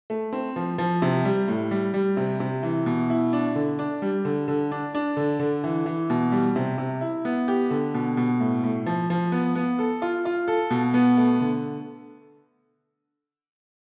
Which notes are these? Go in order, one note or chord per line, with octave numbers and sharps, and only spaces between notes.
A3
C4
F3
F3
C3
G3
A2
G3
G3
C3
C3
E3
B2
E4
D4
D3
D4
G3
D3
D3
D4
D4
D3
D3
E3
E3
B2
G3
C3
C3
E4
B3
G4
D3
B2
B2
A2
A2
F3
F3
B3
B3
A4
F4
F4
A4
B2
B3
A3
D3